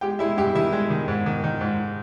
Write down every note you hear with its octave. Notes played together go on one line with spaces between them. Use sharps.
G#3 G4 G5
G#3 E4 E5
G2 G4 G5
D#3 E4 E5
G#3
D#3
G#2
D#3
D#3
G#2